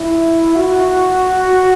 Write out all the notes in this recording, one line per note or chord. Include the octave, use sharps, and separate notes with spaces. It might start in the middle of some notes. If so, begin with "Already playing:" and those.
Already playing: E4
F#4